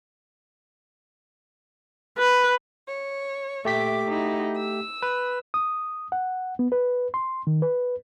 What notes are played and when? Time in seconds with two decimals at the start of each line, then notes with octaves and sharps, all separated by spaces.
2.18 B4
2.87 C#5
3.65 A#2 A3 G4 E5 D6 B6
4.09 D#4 E4 F#4
4.55 E6
5.02 B4
5.54 D#6
6.12 F#5
6.59 B3
6.72 B4
7.14 C6
7.47 D#3
7.62 B4